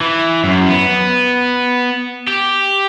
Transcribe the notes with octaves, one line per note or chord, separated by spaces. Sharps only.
E3
F#2
B3
G4